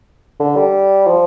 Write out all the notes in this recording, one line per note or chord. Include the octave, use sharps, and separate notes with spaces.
D3
G3
F3